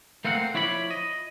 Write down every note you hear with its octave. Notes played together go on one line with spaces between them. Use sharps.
A3 A#3 C4 F5 F#5
F3 E4 C#5 D5 B5
D#5